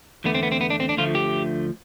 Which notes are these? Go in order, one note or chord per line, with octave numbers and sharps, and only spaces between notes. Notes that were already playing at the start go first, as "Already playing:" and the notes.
E2 D3 A3 B3
C4
B3
C4
B3
D4
C4
D4
D2 D3 F3 A3 F4
G4